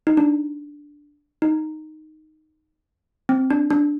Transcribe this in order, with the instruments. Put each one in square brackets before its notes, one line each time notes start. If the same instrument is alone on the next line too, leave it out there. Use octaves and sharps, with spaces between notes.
[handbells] D#4
D4
D#4
C4
D4
D4